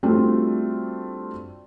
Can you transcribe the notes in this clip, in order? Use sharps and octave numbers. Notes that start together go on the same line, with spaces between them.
G3 A3 C4 D4 F4 F#4